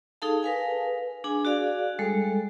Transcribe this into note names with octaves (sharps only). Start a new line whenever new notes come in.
D#4 G#4 A4 F5 A5
A#4 B4 F5 G#5
D4 G#4 G#5
F#4 G#4 D5 F5
G3 G#3 A4